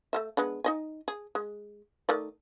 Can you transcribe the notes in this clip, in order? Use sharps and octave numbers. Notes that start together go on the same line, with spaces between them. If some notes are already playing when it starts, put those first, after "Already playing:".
A3 A#3 E5
G#3 B3 D4
D#4 D#5 G#5
G#4
G#3
D#3 A3 D5